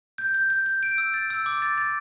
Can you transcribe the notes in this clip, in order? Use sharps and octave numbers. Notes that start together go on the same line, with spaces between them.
G6
G6
G6
G6
D7
E6
A6
E6
D6
A6
A6